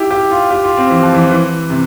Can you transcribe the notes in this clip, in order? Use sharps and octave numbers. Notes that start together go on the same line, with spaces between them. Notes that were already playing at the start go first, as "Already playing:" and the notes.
Already playing: E4 G4
G4
F4
G4
F4
C4
E3
F3
E3
E3
C3